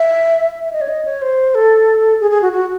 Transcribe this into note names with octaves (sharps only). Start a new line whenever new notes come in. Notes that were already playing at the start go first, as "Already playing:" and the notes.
Already playing: E5
E5
D#5
C#5
D#5
C#5
C5
A4
G#4
G#4
F#4
F#4